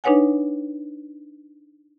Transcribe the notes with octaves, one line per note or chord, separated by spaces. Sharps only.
D4 D#4 B4 C#5 F#5 G#5